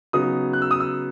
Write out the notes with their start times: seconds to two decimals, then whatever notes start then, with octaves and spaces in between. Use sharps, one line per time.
0.13 C#3 F#3 B3 D#4 D#6
0.53 F#6
0.62 E6
0.71 D#6
0.80 E6